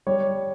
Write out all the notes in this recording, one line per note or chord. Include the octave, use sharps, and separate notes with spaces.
G3 C#5